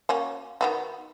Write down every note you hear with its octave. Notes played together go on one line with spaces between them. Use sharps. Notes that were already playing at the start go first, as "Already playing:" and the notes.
A#3 C#4 F#4
D#3 B3 F#4